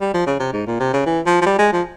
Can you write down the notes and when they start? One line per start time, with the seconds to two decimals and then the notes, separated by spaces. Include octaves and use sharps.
0.01 G3
0.14 F3
0.27 C#3
0.40 C3
0.53 G#2
0.67 A#2
0.80 C3
0.93 C#3
1.06 E3
1.26 F3
1.41 F3
1.46 G3
1.59 G#3
1.73 F3